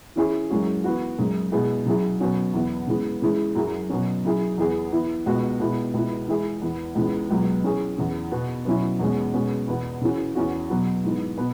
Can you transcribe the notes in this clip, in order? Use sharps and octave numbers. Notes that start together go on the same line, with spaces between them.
E3 C#4 E4 G#4
F#2 E3 G#3 C#4 F#4
E3 B3 F#4
F#2 C#3 G#3
B2 G#3 E4 G#4
C#3 F#3 E4 G#4
B2 F#3 C#4 F#4
E2 E3 B3 E4
C#3 E3 G#3 B3
C#3 E3 G#3 E4
F#2 F#3 E4 G#4
B2 F#3 C#4
C#3 F#3 E4 G#4
E2 E3 B3 G#4
E3 B3 E4
C#2 B2 B3 F#4
B2 G#3 B3 E4
C#2 B2 B3 E4
E3 G#3 E4 G#4
E2 E3 B3
C#2 C#3 E3 B3
C#2 B2 F#3 B3
E3 C#4 G#4
E2 C#3 E3
B2 B3 F#4
B2 F#3 C#4 E4
E2 B2 G#3 C#4
B2 G#3 C#4
E2 B2 B3
C#3 E3 C#4 F#4
E2 E3 C#4 F#4
B2 F#3 B3 F#4
G#2 E3 B3
B2 B3